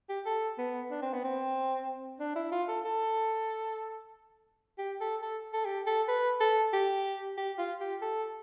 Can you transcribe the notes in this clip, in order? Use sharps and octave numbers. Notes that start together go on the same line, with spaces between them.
G4
A4
B3
D4
C4
B3
C4
D4
E4
F4
A4
A4
G4
A4
A4
A4
G4
A4
B4
A4
G4
G4
F4
G4
A4